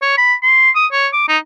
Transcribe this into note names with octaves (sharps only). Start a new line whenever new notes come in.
C#5
B5
C6
D#6
C#5
D6
D#4